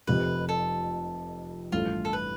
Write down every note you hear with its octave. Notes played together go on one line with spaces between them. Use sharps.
F1 F2 C3 B4
A4
A1 G2 F3 A3 F4
A4
B4